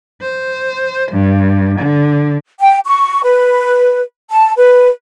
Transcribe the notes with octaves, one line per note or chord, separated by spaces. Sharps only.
C5
G2
D3
G5
C#6
B4
A5
B4